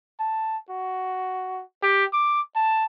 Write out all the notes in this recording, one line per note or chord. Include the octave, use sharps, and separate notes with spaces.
A5
F#4
G4
D6
A5